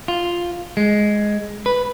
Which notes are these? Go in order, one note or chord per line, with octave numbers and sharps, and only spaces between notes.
F4
G#3
B4